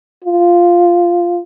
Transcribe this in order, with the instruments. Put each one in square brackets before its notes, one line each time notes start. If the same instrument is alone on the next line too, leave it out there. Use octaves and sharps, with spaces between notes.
[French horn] F4